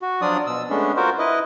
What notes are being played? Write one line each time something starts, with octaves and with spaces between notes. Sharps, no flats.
F#4
F3 F#3 D4 F4 D5 D#6
B2 E6
G#3 A3 B3 C#4 D4
F4 F#4 A#4 C5
E4 B4 D#5